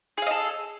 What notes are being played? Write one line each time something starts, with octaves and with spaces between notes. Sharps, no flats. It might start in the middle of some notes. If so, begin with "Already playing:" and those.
G#4 A4 D#5 F5